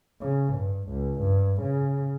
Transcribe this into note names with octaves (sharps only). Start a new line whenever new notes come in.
C#3
G2
C#2
G2
C#3